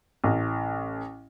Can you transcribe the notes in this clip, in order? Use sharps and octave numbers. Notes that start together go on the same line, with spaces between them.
A1